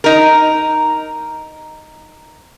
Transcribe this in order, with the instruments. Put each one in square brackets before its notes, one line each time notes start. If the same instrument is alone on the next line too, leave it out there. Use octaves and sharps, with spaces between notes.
[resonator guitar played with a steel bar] D#4 A#4